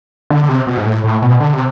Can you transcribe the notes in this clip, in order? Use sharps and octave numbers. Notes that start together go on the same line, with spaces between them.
D3
D3
C3
B2
G#2
A2
A2
B2
D3
C3